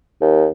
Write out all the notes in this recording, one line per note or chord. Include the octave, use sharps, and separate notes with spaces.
D#2